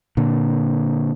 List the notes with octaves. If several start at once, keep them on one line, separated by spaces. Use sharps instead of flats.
A#2 D3